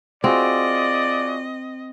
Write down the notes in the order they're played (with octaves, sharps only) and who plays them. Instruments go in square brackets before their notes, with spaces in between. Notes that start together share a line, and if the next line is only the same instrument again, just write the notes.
[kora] C4 [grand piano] F4 F#4 G#4 [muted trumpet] D5 [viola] D#5